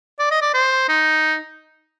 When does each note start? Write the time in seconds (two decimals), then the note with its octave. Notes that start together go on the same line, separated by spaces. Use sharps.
0.19 D5
0.31 D#5
0.42 D5
0.54 C5
0.89 D#4